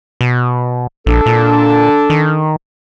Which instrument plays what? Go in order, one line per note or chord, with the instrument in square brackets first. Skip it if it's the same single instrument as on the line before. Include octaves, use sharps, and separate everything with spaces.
[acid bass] B2
[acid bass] A#1 [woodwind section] D4 A4
[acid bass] A#2
D#3